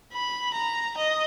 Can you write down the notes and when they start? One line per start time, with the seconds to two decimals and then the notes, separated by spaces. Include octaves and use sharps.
0.12 B5
0.54 A#5
0.97 D#5